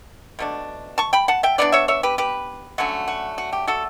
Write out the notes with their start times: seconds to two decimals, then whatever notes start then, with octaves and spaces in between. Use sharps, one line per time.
0.39 B2 A3 D4
0.98 A5 C#6
1.13 G5 B5
1.28 F#5 A5
1.43 E5 G5
1.58 E3 B3 D4 D5 F#5
1.72 C#5 E5
1.88 C#5 E5
2.03 G4 B4
2.18 G4 B4
2.78 D3 F#3 A3 C#4 F#4
3.08 F#4
3.38 F#4
3.53 G4
3.68 F#4 A4